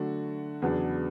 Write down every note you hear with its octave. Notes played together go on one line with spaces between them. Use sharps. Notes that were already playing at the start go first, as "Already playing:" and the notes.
Already playing: D3 F#3 A3 D4 F#4
E2 C#3 F#3 B3 D4